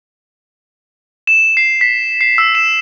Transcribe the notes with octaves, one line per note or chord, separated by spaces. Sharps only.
E7
C7
B6
C7
E6
E7